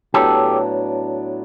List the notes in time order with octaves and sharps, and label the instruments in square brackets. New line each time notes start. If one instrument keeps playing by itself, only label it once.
[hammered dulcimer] A2 F#3 B3 D4 [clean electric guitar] G4 A4